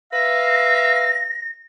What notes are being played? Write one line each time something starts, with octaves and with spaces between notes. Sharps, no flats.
B4 E5 F5 A#6